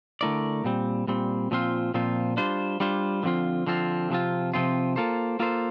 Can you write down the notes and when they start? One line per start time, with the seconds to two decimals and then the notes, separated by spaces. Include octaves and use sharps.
0.21 D3 A3 E4 A#4 D5
0.64 A#2 G3 C4
1.07 A#2 G3 C4
1.51 A#2 F3 C4 F4
1.94 A#2 F3 C4 F4
2.37 G3 D4 F4 C5
2.80 G3 D4 F4 C5
3.23 D3 F3 C4 F4
3.67 D3 F3 C4 F4
4.10 C3 F3 C4 F4
4.54 C3 F3 C4 F4
4.96 A#3 F4 A4 C5
5.40 A#3 F4 A4 C5